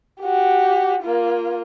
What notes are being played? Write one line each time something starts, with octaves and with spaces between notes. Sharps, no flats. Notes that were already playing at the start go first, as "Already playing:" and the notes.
F#4 G4
A#3 F4